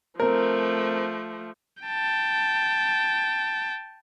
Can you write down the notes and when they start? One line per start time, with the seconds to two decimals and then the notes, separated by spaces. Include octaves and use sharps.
0.20 F3 A3 C4 A#4
1.83 G5 A5